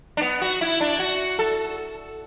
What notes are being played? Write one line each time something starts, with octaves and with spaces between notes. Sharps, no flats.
D4
B3
F#4
E4
D4
F#4
A4